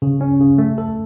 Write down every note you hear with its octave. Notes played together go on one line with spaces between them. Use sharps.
C#3
C#4
C#3
A3
A4